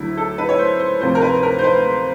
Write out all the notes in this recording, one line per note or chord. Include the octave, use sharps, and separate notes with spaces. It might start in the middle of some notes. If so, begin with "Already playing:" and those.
Already playing: D2 D3 F#3 E4
A4
B4
C#5
C5
C5
D2 C3 F3 C5
A#4
B4
A#4
C5
B4